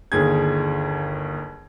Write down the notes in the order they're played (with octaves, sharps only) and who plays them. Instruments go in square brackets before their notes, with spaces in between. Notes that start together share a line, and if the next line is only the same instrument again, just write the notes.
[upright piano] G1 D#2 G#4 G#6